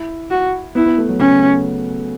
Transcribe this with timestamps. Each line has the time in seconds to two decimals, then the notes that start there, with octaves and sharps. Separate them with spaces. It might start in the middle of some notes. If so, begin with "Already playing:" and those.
Already playing: E4
0.31 F#4
0.75 B3 E4
0.86 B3
0.98 A3
1.09 F#3
1.19 C#3 C#4